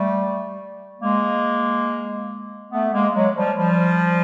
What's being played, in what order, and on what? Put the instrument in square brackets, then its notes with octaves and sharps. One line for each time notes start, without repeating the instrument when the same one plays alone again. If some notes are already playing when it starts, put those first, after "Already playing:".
Already playing: [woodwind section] G3 A3
G#3 A#3
A3 B3
G#3 A#3
F#3 G#3
F3 G3
F3 G3